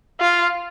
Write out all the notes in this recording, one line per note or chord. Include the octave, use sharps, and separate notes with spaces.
F4